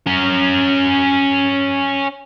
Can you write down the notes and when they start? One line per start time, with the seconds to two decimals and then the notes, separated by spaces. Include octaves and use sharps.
0.07 C#4 A#4